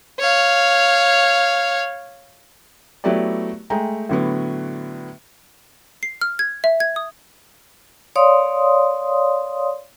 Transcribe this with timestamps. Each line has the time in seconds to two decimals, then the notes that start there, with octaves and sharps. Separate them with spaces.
0.20 C#5 F5
3.04 F#3 A3 B3 E4 G4 D5
3.70 G#3 A3 G5 A#5
4.09 A2 D3 F#3 B3
6.03 C7
6.21 F6
6.39 G#6
6.64 E5
6.80 G#6
6.96 D#6
8.16 C#5 D5 F5 C6 D#6